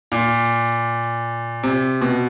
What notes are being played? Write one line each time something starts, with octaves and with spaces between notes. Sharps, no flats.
A#2
C3
B2